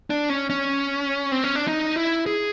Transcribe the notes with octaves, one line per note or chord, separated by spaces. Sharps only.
D4
C#4
C#4
C4
C#4
D4
D#4
E4
G#4